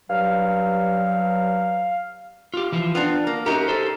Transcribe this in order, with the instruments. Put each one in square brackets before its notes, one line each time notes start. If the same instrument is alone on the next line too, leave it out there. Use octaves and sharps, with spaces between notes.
[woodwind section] G2 F#3 [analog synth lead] F5
[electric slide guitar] F4 G4
E3 F3 F4
[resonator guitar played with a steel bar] B3 C4 D4 [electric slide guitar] F4
[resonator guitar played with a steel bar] A#3
[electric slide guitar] C#4 F#4 G4 [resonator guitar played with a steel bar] D#4 A#4
[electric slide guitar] G4 A4 C5